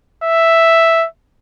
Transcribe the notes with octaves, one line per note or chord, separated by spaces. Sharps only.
E5